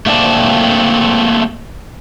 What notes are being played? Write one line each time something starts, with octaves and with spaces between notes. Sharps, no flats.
A3 A#3 C4 D5 A5